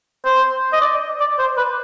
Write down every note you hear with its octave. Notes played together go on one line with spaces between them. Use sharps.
C5
D#5
D5
D5
C5
B4